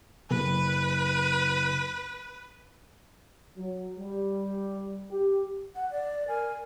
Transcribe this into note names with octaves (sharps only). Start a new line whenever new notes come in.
F#1 B4
F#3
G3
G4
F#5
D5
A#4 G#5